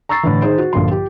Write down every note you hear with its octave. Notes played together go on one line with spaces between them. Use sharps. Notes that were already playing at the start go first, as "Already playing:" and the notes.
A#5 C#6 E6 A6 C7
A2 D3 E3
D#3 D#4 G#4 C5
F#4
A#1 G2 D3 F3 C6
G4